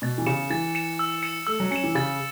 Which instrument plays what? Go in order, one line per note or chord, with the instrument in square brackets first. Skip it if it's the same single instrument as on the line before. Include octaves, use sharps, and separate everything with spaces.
[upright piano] B2 [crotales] A6
[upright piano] E3
[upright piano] C#3 [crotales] C#7 E7
[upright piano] E3 [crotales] A6
[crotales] C#7 E7
E6
C#7 E7
[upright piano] A3 [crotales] E6
[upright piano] F#3
[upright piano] C#4 [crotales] C#7 E7
[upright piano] E3
[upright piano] C#3 [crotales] A6